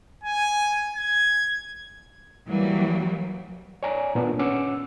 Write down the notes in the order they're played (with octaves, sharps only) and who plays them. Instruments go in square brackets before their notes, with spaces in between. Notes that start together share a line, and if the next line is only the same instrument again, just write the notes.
[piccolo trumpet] G#5
G#6
[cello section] E3 F#3 G3 A#3
[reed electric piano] C#5 D5 G#5 A#5
A#2 B3 D4
C#4 F#5 D6 E6